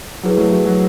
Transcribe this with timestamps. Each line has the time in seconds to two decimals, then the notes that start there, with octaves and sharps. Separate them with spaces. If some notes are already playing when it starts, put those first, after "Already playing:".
0.23 F#3 E4 G#4 B4
0.37 F#3 A3
0.52 F#3
0.66 F#3